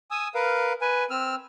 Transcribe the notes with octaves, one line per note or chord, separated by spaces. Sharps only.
G#5 D#6 E6
A#4 B4 F5
B4 G#5
C4 E6 F6